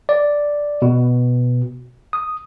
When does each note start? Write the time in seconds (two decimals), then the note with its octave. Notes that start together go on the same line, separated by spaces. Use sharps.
0.09 D5
0.82 B2
2.13 D#6